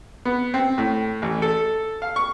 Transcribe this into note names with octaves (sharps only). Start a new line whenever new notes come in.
B3
C4
A2
A1
A4
F5
C#6